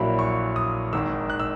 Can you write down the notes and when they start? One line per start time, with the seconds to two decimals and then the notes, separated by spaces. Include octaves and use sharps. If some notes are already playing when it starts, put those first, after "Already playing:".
Already playing: A#1 A#2 F#3 A#3 E4 B5
0.19 C#6
0.56 D#6
0.93 G#1 G#2 D#3 E6
1.30 F#6
1.40 E6